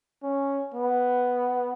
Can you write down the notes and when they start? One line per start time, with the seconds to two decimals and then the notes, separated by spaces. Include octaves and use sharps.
0.23 C#4
0.74 B3